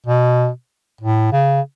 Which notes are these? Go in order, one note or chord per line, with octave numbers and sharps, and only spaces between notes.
B2
A2
C#3